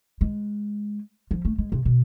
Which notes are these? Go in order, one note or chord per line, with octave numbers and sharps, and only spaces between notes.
G#3
F3
A3
G#3
C3
B2